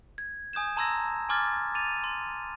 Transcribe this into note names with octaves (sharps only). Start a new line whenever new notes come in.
G#6
G#5 D#6 G6 G#6 E7
A5 A#5 C6 E6 G#6 A#6
G#5 C6 D6 F6 G#6 A6
D6 A6 D#7 F7
C6